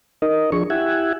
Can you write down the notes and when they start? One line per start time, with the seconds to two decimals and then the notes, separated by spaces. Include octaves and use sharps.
0.22 D#4 A#4 D#5
0.52 F3 D4 G#4 C#6
0.70 E4 G4 E5 F#5 G#5